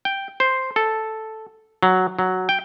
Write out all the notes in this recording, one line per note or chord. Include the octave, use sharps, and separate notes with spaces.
G5
C5
A4
F#3
F#3
G5